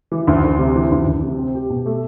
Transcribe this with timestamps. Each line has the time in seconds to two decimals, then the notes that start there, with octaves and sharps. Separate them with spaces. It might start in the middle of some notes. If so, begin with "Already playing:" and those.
0.12 E3
0.27 D2
0.44 D2
0.59 C3
0.76 E3
0.91 D2
1.07 D2
1.22 C3
1.39 C4
1.55 G4
1.70 B2
1.86 A3